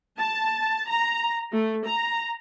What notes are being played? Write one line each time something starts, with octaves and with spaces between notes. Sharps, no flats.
A5
A#5
A3
A#5